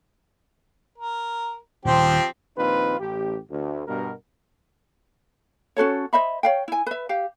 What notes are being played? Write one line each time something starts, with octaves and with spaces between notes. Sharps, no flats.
A#4
D#1 F3 C4 G4
A#1 D#2 C4 D#4 F4 B4
A1 G4
D2
G2 B2 A#4
C#4 F#4 A4 C#5
C5 D#5 E5 B5
C#5 F5 G5
E4 G#5
B4 E5
G4 F5